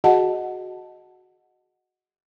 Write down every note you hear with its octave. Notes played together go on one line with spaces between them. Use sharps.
F#4 G#4 D#5 F#5 A5